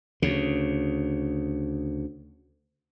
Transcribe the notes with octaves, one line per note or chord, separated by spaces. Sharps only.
D2 C#3